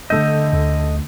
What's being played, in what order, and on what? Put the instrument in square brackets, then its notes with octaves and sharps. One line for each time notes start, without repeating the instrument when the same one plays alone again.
[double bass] D3 [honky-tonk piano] A3 E6 G6 [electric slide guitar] D#5
[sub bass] D2